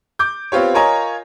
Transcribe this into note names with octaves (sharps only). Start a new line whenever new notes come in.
D6 G6
B3 C4 F4 G4 C#5
F4 A#4 C#5 D#5 G#5 A#5